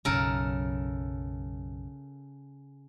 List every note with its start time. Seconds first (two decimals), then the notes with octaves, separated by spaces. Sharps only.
0.05 B1 F#2 C#3 A4 A#4